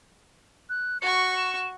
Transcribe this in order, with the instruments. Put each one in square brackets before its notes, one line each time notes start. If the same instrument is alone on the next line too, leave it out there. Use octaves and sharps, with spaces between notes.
[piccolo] F#6
[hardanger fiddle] F#4 C#6 [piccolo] C#7
[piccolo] E7